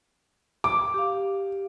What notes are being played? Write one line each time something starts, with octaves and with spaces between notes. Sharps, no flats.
D6
G4 F5